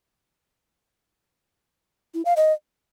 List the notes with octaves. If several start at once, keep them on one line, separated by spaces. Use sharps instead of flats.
E4
F5
D#5